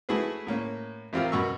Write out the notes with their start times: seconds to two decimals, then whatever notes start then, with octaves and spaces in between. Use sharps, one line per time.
0.09 A3 E4 F#4 G#4 B4
0.47 A2 A#3 C#4
1.13 A1 C4 F4 G4 A#4
1.32 F#2 B2 F#4 C#6 E6